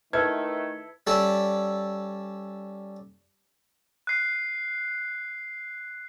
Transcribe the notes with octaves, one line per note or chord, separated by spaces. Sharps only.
D#3 A3 E4 A4 B4 G#6
G3 C#4 A4 D5 E5
F#6 C7